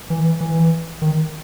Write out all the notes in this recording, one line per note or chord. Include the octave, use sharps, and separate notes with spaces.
E3
E3
D#3